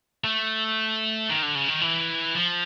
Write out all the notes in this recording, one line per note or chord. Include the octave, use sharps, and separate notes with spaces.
A3
D#3
D3
C#3
D#3
E3
F3